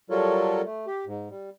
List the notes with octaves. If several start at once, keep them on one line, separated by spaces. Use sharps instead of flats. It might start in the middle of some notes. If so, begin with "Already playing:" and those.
F#3 G3 F4 A4 A#4 C#5
A3
G4
G#2
G3